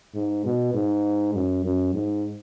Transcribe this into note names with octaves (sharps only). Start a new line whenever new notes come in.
G#2
B2
G#2
F#2
F#2
G#2